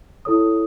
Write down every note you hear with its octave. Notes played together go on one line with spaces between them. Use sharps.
E4 A4 C#5 D#6